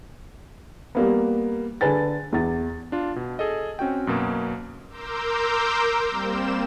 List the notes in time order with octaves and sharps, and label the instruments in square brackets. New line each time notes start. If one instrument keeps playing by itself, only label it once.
[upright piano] G3 A#3 B3
D3 G#4 B4 G#5 A6
E2 A6
[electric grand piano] D4 F4
B2
G#4 A4 D#5
C4 C#4 F#4 G5
F#2 B2 A#3
[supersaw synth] A#4 A#5 C6 D6 E6 G6
G3 A#3 C4 E7